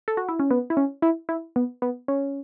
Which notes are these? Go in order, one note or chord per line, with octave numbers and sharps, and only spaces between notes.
A4
F#4
E4
C#4
B3
E4
C#4
E4
E4
B3
B3
C#4